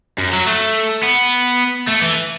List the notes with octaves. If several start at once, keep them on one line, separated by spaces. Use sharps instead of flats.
F#2
F#3
A3
B3
A3
E3